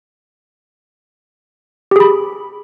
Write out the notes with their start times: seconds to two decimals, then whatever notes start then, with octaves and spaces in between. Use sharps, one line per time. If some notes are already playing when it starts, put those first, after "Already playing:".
1.91 G4
1.96 G#4
2.00 B5